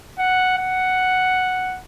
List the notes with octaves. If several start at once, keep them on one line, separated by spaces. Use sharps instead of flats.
F#5
F#5